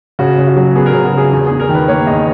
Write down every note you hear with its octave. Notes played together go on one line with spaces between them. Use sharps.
C#3 F#4
C#3
F#4
F#3
B3 G#4
A#4
C#3 G#4
F#4
C#3 G#4
E2 G#4
E2 G#4
A#4
D#3
B4
A#3 C#5
E2 D#5